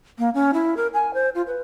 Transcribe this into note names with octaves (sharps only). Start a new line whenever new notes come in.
A#3
C#4
E4
A#4
G#5
C5
F4
B4